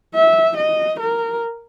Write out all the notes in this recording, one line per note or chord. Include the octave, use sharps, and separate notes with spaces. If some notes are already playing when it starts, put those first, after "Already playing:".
E5
D#5
A#4